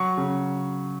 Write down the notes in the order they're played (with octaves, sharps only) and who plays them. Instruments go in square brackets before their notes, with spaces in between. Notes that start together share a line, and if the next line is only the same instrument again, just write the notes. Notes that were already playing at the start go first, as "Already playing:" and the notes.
Already playing: [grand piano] F#3 C#6
C#3